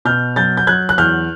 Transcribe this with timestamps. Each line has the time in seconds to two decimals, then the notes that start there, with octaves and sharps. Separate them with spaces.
0.05 B2 F6 G6
0.36 F#3 G6 A6
0.57 G6
0.67 F#3 F#6 G#6
0.89 F#6
0.98 E2 F6 G6